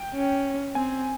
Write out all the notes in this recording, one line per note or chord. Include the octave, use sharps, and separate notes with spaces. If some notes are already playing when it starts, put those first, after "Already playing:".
Already playing: G5
C#4
C4 G#5